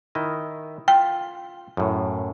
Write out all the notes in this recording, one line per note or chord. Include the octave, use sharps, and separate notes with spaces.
D#3 E4 D#5
F4 G5
F#2 A2